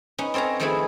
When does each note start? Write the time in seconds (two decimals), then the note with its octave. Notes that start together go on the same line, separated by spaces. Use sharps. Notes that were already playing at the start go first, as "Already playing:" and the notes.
0.18 B3 C#4 D#4
0.34 C4 A4 C#5 F5 A#5
0.60 D#3 F3 A3 B3 E4 G#4